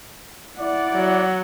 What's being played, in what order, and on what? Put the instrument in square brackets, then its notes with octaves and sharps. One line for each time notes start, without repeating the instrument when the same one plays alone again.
[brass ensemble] E4 D5 [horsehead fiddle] F#5
[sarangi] F#3